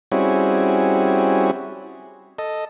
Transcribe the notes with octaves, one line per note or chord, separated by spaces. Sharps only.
G3 C4 C#4 E4 F#4 G#4
A4 D#5